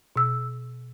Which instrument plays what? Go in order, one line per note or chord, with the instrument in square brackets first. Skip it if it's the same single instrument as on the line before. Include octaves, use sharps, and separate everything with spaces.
[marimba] B2 E6